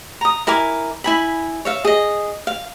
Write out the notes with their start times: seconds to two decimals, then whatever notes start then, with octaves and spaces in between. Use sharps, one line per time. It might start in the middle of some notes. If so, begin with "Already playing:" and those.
0.21 A#5 D#6
0.47 E4 A#4 G#5 D6
1.04 E4 G#5 B5
1.65 C#5 E5 F5
1.85 G#4 D#5
2.47 F5